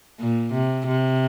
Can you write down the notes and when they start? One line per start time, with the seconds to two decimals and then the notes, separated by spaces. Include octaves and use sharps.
0.20 A#2
0.53 C3
0.87 C3